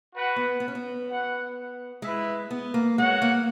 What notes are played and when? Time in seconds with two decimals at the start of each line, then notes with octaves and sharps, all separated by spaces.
0.12 F#4 B4 F#5
0.36 B3
0.60 B3
0.68 C#4
0.75 B3
1.08 F#4 B4 F#5
2.02 G#3 E4 B4 E5
2.51 B3
2.74 A#3
2.98 G#3 F#4 C#5 F#5
3.22 A#3